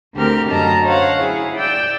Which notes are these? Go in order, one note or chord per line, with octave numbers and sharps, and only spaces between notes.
D2 D3 C4 G4 A#4 F6
F#2 D3 F#3 D#5 A5 A#5
C5 C#5 F5 F#5
E4 G#4
D5 G5 E6 G6